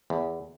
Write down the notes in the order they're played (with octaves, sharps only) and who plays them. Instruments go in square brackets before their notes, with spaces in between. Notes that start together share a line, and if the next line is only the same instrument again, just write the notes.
[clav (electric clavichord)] E2